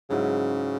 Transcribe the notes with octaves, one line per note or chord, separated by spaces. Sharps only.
G#2 C#3 F#3 C#4 E4